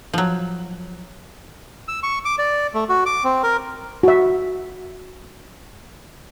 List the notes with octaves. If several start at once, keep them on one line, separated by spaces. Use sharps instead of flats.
F3 F#3
E6
C#6
D6
D5
A3
F#4
D6
C4
A#4
F#4 E5